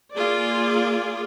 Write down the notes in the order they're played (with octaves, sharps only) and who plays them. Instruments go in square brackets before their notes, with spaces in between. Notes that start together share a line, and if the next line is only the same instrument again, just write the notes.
[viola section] A#3 F4 G#4 D5